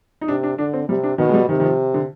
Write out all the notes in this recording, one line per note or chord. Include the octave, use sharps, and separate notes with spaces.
D#4
C3 D4
D4
D3 D4
C4
C3 G3
D4
B2 D#3
G#3
G3
C3 D#3
D#3
F3
D3